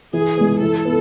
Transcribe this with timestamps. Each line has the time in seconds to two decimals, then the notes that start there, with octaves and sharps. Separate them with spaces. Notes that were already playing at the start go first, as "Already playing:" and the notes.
0.13 E3 G#4
0.37 G#3 B3
0.62 E3 A4
0.85 B3